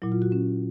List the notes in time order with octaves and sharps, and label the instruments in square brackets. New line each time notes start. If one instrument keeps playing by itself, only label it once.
[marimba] A#2 F#3 E4
F4
F#4
C#4